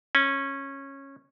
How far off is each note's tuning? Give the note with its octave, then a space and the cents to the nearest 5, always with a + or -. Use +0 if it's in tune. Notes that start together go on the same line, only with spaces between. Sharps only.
C#4 -15